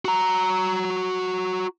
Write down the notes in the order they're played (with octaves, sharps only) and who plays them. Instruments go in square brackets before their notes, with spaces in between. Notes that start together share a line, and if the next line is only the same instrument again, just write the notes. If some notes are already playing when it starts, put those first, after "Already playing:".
[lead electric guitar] F#4 A#5